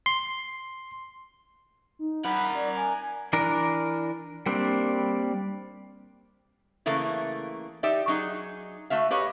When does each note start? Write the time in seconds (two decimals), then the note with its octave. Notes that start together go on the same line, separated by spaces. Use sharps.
0.06 C6
1.99 D#4
2.25 A#4 F#5 B5
2.55 D5
2.77 G#5
3.33 E3 D4 A#4
4.46 G3 A#3 C4 D4
6.86 C#3 E3 A3 A#3
7.83 D#4 G4 D5 E5
8.08 F#3 D#4 G#4
8.90 A3 F#4 E5 F5
9.11 G4 B4 C#5 D#5 F5